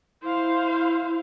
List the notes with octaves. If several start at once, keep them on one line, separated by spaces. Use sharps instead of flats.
E4 C5 F5